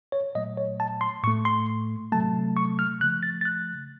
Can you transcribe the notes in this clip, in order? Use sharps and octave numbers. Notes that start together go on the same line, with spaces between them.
C#5
A#2 F#3 A3 D#5
C#5
A5
C6
A2 A3 C#6
C6
C3 F#3 A3 A5
C#6
F6
C#3 F3 A3 F#6
A6
A6
F#6